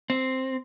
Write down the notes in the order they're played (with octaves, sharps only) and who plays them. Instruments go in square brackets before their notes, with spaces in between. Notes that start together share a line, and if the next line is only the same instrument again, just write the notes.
[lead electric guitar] C4